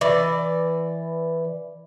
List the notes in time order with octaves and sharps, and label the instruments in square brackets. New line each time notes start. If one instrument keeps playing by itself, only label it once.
[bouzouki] E3 D5